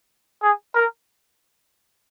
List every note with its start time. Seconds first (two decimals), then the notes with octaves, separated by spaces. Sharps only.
0.43 G#4
0.75 A#4